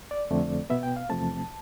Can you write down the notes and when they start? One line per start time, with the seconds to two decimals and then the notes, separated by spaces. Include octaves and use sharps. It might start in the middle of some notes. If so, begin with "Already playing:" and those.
0.11 D5
0.31 F2 D3 A3 C4
0.70 B2 B3 E5
0.83 G5
0.96 F5
1.09 E2 C3 F3 A3 C4 A5